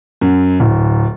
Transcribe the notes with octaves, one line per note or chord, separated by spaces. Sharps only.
F#2
D1